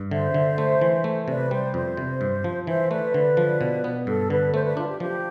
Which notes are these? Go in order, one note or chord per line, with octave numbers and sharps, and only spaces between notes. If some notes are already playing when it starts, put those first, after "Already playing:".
Already playing: G2
D3 C5 E5
D3
A3
E3
A3
C3 B4 D5
G3 C5
F2 C5
C3
G2
F3
E3 C5 E5
A3 B4 D5
D3
F3
B2
B3
G2 A4
D3 B4
A3 C5
B4 D5
D4 F4
G4
F3 G4